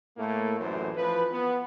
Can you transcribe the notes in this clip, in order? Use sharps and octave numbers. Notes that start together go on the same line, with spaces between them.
A2 A3 A#3
A1 F#2 A#2 E3 C5
E3 F3 B4
B3